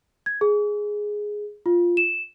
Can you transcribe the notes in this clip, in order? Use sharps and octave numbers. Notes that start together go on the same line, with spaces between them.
G#6
G#4
F4
E7